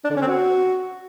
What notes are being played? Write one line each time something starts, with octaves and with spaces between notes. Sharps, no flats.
D4
D3
C#4
C4
F#4